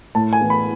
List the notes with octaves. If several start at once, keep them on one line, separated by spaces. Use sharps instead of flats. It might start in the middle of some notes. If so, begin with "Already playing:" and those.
A2 A5
G#5
E3 B3
B5